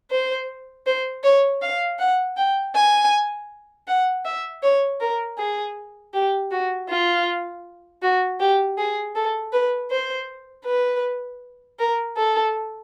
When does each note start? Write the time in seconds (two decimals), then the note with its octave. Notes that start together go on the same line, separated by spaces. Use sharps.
0.11 C5
0.86 C5
1.24 C#5
1.62 F5
1.99 F#5
2.37 G5
2.75 G#5
3.88 F#5
4.25 E5
4.63 C#5
5.01 A#4
5.38 G#4
6.14 G4
6.51 F#4
6.89 F4
8.02 F#4
8.40 G4
8.78 G#4
9.15 A4
9.53 B4
9.91 C5
10.66 B4
11.79 A#4
12.17 A4